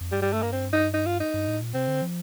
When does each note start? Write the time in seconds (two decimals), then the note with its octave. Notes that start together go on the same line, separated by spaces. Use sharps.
0.01 F2
0.12 G2 G3
0.22 G3
0.33 A3
0.43 A#3
0.52 C4
0.73 D#4
0.94 D#4
1.06 F4
1.20 D#4
1.34 G2
1.48 A2
1.61 A#2
1.74 C3 C4
1.88 D3
2.02 F3